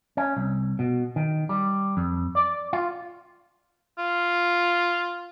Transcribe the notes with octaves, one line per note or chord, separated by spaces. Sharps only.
C#4
C2
B2
D#3
G3
F2
D5
F4
F4